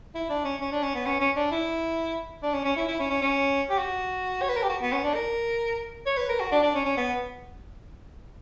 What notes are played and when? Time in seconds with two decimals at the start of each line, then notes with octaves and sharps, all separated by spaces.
0.15 E4
0.30 D4
0.45 C#4
0.61 C#4
0.72 D4
0.83 C#4
0.95 B3
1.06 C#4
1.20 C#4
1.36 D4
1.51 E4
2.43 D4
2.54 C#4
2.65 C#4
2.76 E4
2.88 E4
3.00 C#4
3.10 C#4
3.22 C#4
3.70 G4
3.79 F#4
4.42 C#5
4.49 B4
4.56 A#4
4.63 G4
4.69 F#4
4.82 B3
4.92 C#4
5.04 D4
5.15 A#4
6.06 C#5
6.17 B4
6.29 A#4
6.40 F#4
6.52 D4
6.63 D4
6.75 C#4
6.85 C#4
6.97 B3